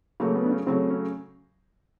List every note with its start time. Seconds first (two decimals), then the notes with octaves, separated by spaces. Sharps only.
0.20 C#3 F#3 A3 A#3
0.36 B3
0.45 D4
0.51 C#4
0.66 C#3 F#3 A3 C4
0.91 C#4